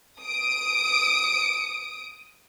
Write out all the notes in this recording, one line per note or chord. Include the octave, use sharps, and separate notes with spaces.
D#6 D7